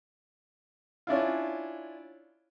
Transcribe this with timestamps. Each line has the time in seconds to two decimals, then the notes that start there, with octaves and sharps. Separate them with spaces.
1.07 C#4 D4 E4 F4